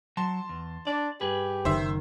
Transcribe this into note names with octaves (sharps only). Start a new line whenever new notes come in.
F#3 A5 C6
E2
D4 D5
G2 G4 G#4 B4
F#1 D#3 C5 E5